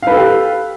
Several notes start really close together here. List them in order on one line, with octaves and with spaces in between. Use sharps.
F5 B4 A4 G4